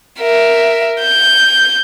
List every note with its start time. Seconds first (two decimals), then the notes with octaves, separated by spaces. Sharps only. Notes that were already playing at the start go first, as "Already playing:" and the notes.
0.20 A#4 E5
1.01 G6